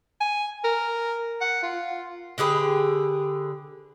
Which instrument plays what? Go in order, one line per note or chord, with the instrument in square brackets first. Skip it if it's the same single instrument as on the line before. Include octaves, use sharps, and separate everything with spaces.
[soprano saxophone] G#5
A#4
F#5
F4
[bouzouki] D3 G4 G#4 B4